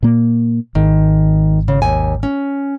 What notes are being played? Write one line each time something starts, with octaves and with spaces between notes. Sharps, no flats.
A#2 A#3
G#1 D#3
C#3
D#2 G#5
C#4